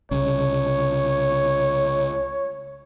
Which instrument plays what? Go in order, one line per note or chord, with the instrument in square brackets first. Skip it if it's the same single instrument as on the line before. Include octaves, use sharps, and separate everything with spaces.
[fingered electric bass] C2 C#3 [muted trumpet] C#5